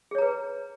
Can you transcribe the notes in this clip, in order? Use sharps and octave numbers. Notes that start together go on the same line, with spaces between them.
G#4 B4 C#5 A#5